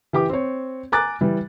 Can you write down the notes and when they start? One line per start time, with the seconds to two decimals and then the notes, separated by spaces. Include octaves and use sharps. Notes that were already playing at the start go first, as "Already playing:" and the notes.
0.13 E3 G4 D6
0.29 C4 C#5
0.92 G#5 A#5 D6 F#6 A6
1.21 E3 G3